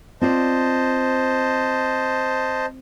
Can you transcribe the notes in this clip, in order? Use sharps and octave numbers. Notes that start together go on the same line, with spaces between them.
C4 F4 C5 D5 D#5 A5